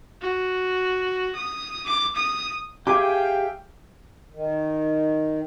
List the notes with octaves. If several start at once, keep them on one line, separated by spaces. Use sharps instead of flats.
F#4
D#6
D6
D#6
G4 G#4 E5 F5 G5 G#5 D6
D#3